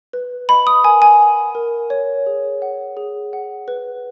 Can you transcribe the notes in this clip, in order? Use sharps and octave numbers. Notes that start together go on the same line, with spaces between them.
B4
D#5 B5
D#6
A#4 G#5
G#5
F#5
A#4
C#5
G#4
F#5
G#4
F#5
B4